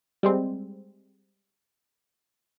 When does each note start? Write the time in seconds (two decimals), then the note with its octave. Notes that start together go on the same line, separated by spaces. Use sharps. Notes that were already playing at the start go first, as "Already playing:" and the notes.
0.23 G3 G#3 C4